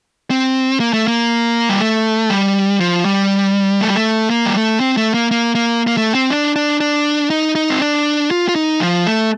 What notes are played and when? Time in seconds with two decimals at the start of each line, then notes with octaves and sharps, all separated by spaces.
0.30 C4
0.80 A#3
0.93 A3
1.07 A#3
1.69 G3
1.80 A3
2.30 G3
2.80 F3
3.05 G3
3.81 A3
3.88 G3
3.96 A3
4.30 A#3
4.46 G3
4.56 A3
4.80 C4
4.97 A3
5.14 A#3
5.31 A#3
5.55 A#3
5.87 A#3
5.97 A3
6.15 C4
6.30 D4
6.56 D4
6.80 D4
7.30 D#4
7.55 D#4
7.70 C4
7.81 D4
8.31 F4
8.49 F4
8.55 D#4
8.80 F3
9.06 A3